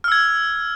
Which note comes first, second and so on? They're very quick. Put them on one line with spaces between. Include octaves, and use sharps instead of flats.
F6 E6 G#6